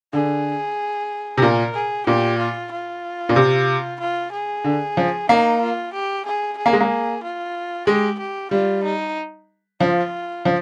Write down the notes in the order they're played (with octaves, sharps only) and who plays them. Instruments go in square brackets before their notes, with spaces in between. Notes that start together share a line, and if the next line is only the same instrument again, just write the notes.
[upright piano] D3 [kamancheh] G#4
[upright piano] C3
[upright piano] A#2 [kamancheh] A#4
[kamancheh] G#4
[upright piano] A#2 [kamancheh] G4
[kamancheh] F4
F4
[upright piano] A#2
C3
[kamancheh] F4
G#4
[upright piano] D3
F3
[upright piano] A#3 [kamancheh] D#4
[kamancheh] F4
G4
G#4
G#4
[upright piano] A#3
G#3
A#3
[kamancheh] F4
[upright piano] G#3 [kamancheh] G4
[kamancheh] G4
[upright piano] G3 [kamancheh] F4
[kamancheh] D#4
[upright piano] F3 [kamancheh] F4
[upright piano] F3